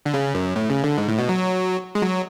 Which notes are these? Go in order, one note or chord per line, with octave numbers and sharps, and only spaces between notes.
D3
C#3
F#2
A2
C#3
D3
G#2
A2
B2
F#3
G#3
F#3